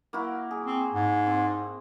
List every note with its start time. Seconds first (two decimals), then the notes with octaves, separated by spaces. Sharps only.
0.13 A#3 E4 F#4
0.51 G#4
0.66 C4
0.94 G#2
1.26 C4